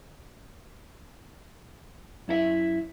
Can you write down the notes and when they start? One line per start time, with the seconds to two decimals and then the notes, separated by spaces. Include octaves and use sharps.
2.28 F#2 E4 A4 E5